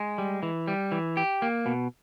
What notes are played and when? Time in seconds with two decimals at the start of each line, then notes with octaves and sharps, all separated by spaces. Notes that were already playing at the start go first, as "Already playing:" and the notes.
Already playing: G#3
0.18 G3
0.43 E3
0.67 G3
0.92 E3
1.17 G4
1.42 A#3
1.66 B2